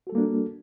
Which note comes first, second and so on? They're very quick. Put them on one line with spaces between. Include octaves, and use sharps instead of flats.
F#4 A4 G3 A#3 D4